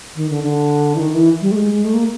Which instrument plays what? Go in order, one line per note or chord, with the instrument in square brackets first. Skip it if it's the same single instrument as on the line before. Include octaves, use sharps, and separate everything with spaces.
[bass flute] D#3
D3
D3
E3
D#3
E3
G3
A3
G#3
A3
A#3